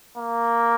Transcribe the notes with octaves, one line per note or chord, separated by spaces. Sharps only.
A#3